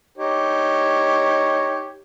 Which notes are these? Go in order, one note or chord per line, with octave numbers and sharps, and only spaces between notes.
D#4 G4 C#5